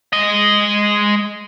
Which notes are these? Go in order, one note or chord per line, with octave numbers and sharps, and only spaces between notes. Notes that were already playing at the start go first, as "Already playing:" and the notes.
G#3 D#5